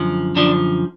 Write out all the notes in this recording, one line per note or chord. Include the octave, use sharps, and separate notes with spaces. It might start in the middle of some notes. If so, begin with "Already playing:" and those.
Already playing: F#2 D3 F3
F#2 D3 F3 D4